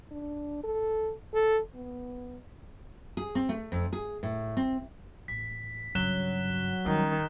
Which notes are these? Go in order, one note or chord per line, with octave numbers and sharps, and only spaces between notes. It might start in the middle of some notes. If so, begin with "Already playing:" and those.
D4
A4
A4
B3
G#4
C4
A3
F2
G#4
A2
C4
A1 B6
G2 C#3 F#3 F#6 E7 G7
D#3 G3 C#4